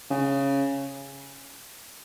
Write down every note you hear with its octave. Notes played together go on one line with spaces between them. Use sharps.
C#3